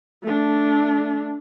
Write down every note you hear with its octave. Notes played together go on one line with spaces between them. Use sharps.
A3 D4